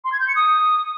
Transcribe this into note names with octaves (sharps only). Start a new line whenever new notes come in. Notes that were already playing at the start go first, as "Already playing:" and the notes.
C6
G#6
G6
C#7
D#6